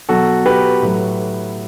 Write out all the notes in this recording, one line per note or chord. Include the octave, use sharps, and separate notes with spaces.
B2 F#3 F#4 A4
G4 B4
A2 F#3